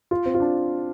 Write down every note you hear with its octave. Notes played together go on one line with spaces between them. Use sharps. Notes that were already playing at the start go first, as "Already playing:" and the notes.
F4
C4
F4
D4